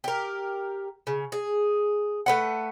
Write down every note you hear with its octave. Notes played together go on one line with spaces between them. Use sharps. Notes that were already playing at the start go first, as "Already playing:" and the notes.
G4 A#4
C#3
G#4
A3 B4 F#5